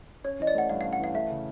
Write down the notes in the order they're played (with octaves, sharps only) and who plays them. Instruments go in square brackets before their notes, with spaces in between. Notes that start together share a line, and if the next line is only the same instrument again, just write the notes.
[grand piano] C#4 [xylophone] C#5
[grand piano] E3 [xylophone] D#5
[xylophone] D5
[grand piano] A3 [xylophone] F#5
[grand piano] G2 [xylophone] F5
[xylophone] F5
[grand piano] C#4
[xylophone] F#5
[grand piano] E3 [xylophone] F5
[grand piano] A3 [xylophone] E5
[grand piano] C#3